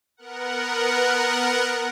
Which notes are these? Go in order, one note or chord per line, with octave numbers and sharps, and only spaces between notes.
B3 A#4 F#5